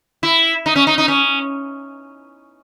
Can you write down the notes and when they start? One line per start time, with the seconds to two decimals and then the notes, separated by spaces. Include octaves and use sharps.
0.23 E4
0.66 D#4
0.76 C#4
0.87 D#4
0.98 D#4
1.08 C#4